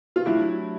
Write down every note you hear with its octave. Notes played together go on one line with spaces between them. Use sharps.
F4
F#3 A3 D4 E4 G4